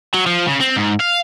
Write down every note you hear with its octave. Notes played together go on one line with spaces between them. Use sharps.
F#3
F3
C#3
C4
G#2
F5